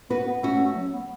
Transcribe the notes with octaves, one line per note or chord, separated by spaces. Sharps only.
B3 F#4 B4
B3
A3 C#4 F#4
A3
A3
F#3
B3